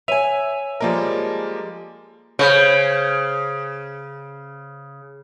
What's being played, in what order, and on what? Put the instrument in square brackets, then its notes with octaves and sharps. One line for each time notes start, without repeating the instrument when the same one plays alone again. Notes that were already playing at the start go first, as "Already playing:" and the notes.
[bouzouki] B4 G#5 [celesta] C#5 D#7 F7 [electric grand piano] E5
[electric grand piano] F3 A#3 A#4 [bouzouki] G3 G#3 A4
[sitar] C#3 [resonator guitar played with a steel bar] C5 C#5